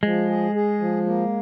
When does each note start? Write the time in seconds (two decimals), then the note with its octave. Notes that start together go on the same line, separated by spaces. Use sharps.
0.03 F3 G#3
0.28 G#4
0.55 G#4
0.80 F3
1.06 A#3